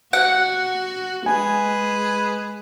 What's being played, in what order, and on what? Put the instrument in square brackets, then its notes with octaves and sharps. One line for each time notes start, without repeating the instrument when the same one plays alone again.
[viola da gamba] F#4 [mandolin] F#5
[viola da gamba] G#3 [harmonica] G#4 B4 [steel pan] G#5